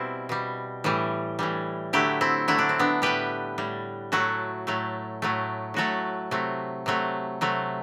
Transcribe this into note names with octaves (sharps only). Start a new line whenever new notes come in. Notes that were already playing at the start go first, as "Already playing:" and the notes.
Already playing: B2 G3 C4 E4
B2 G3
A2 E3 G3
A2 E3 G3
D3 F#3 A3 E4 G4
C4 E4
D3 F#3 A3 E4
D4
C4
B3 D4
A2 G3 G4 B4
A2 G3
A2 F#3 A3 F#4 A4
A2 F#3 A3
A2 F#3 A3
A2 F#3 A3 F#4 A4
C3 F#3 A3
C3 F#3 A3
C3 F#3 A3